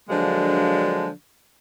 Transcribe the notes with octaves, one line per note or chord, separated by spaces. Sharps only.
D3 F3 F#3 G#3 A#3 D4